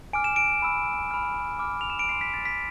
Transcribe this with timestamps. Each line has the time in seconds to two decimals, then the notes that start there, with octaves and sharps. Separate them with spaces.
0.13 G#5 D6 F6 D7
0.24 E7
0.36 D7
0.62 B5 E6
1.11 B5 F6
1.59 B5 D6 F6
1.81 F7
1.90 E7
1.99 D7
2.09 G#5 C6 E6 C7
2.21 B6
2.34 A6
2.45 B6